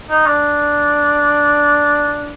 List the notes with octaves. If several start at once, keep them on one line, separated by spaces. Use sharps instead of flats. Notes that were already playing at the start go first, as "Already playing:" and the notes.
D#4
D4